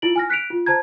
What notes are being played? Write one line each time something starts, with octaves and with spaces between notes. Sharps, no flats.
E4 F4 D7 F#7
G#5 F6 A#6
F#6 B6 C#7 D7 F7
F4
C5 A5 A#5 G#6